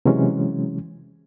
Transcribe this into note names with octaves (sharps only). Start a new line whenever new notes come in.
C3 E3 F#3 G#3 C#4